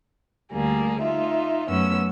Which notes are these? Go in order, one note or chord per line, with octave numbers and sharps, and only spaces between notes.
D2 D3 G3 A#3 G#4
D#4 F4 E5
F#2 A3 B3 C#4 E6